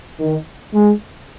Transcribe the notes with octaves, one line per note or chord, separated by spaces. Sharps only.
D#3
G#3